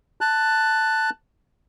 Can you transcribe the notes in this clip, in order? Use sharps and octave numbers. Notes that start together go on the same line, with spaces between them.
A5 F#6